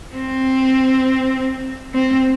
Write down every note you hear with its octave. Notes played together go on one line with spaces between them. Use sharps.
C4
C4